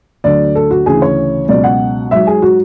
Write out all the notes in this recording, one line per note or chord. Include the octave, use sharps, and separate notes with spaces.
D2 D3 F#3 D5
A4
F#4
D2 C#3 E3 G#4
C#5
C#2 B2 F#3 D5
F#5
G#2 F#3 E5
G#4
F#4